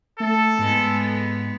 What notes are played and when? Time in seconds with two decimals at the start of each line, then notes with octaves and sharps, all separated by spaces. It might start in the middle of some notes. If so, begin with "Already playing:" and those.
0.20 A3 A4
0.59 G#2 G#3 B3